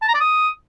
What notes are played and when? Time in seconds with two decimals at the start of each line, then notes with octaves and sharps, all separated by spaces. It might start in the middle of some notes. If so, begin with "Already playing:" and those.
0.02 A5
0.08 A#5
0.14 D5
0.20 D#6